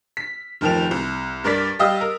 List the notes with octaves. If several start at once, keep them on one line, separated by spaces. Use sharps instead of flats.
B6
F1 D#3 F3 G5 F7
C2
G2 A#4 D5 A6 B6
G3 G4 D#5 F5 D#6 E6
A#4